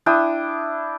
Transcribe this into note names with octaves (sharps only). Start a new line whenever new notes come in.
D4 E4 G5 D#6